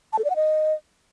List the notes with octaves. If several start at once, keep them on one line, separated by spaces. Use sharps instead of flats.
A5
A4
D5
F#5
D#5